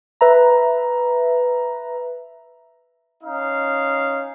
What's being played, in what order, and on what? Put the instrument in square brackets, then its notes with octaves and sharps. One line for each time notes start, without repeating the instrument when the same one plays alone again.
[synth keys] B4 E5 A#5
[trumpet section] C#4 D#4 F5